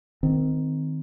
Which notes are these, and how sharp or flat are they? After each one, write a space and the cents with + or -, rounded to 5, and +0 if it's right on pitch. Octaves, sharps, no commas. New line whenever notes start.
D#3 +0 C4 -25